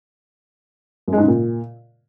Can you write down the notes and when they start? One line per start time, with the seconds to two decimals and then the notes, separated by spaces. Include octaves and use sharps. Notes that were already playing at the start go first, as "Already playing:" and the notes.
1.08 F#2
1.13 G#3
1.18 G#2
1.23 C#3
1.28 A#2